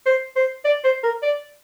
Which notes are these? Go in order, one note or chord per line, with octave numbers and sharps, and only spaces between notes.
C5
C5
D5
C5
A#4
D5